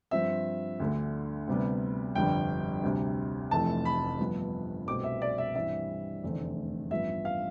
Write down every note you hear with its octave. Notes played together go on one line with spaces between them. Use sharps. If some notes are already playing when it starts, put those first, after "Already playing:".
G2 F3 C4 E5
D2 D3 A3
D2 C3 G3 B3
G1 F2 D3 G3 G5
D2 C3 G3
F1 F2 C3 E3 A3 A5
B5
G1 G2 F3 B3
C2 B2 A3 C4 D6
E5
D5
E5
G2 E3 G3 C4 E5
F1 E2 D3 A3 C4
A1 G2 F3 B3 E5
F5